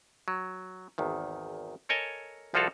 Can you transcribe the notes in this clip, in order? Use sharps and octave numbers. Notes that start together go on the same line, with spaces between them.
F#3
G#1 E2 D#3
A4 A#4 C#5 D#5 G#5 A5
C2 F3 F4 F#4 A4 F5